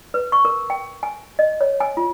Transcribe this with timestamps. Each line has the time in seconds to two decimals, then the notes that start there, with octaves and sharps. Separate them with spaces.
0.14 B4
0.32 C#6
0.45 A#4
0.70 G5
1.03 G#5
1.39 D#5
1.61 C#5
1.80 G#5
1.97 F4